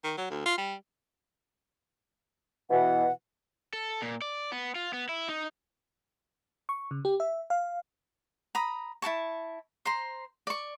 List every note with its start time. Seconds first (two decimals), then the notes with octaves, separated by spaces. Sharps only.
0.04 D#3
0.18 F#3
0.30 D2
0.46 F4
0.58 G3
2.70 B2 E3 F#5
3.73 A4
4.02 A#2
4.22 D5
4.52 B3
4.75 F4
4.93 B3
5.09 E4
5.29 D#4
6.69 C#6
6.91 C#3
7.05 G4
7.20 E5
7.50 F5
8.55 A#5 B5 D#6
9.02 E4 A4 A5 C#6
9.85 C5 A#5 C6
10.47 D5 C#6